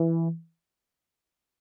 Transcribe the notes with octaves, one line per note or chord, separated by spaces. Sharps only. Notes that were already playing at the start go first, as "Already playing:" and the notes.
Already playing: E3